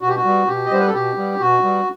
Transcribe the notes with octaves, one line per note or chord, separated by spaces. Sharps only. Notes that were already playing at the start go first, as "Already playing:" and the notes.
B2 F#4
G4
F#4
G3 B3
B2 G4
D#5
G3 B3 C5
B4
A4
B2 G4
G3 B3
B2 F#4
G3 B3